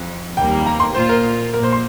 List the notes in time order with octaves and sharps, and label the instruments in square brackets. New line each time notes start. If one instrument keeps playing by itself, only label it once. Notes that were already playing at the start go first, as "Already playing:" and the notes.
Already playing: [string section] F2
[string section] D#2 D#3 G3 A#3 [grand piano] G5
[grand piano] A#5
C6
[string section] A#2 A#3 F4 [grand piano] C5
[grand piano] A#4
[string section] A#1 A#2 A#3 [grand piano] A#4
[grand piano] C5
C6